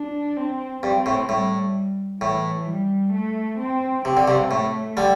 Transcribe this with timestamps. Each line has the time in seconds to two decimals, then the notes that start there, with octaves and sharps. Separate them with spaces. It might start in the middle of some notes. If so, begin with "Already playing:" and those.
Already playing: D4
0.37 C4
0.83 G2 C4
1.06 A2
1.29 A2 G3
2.21 A2 E3
2.67 G3
3.13 A3
3.59 C4
4.05 C3 C4
4.17 D3
4.28 G2 C3
4.51 A2 A3
4.97 D3 G3